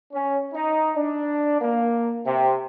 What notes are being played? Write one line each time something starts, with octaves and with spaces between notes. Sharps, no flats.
C#4
D#4
D4
A#3
C3